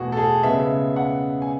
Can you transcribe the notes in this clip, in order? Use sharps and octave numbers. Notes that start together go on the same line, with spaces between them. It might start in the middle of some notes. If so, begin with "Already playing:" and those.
Already playing: E2 B2 A3 F#4 G#4
A4
G#4
C#3 G#3 B3 E5
F#5
G#5